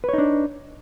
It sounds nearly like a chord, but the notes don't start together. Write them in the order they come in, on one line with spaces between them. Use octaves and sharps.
B4 C#5 D#4 D4